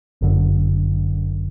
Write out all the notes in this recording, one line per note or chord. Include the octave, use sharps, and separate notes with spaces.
G1 F#2 D3